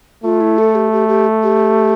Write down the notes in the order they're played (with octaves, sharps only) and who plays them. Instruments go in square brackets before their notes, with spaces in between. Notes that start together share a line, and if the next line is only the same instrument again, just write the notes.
[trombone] A3 [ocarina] F4
[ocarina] E4
A4
G4
G4
G4
G4